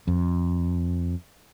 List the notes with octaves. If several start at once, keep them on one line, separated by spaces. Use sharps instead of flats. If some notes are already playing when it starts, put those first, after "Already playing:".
F2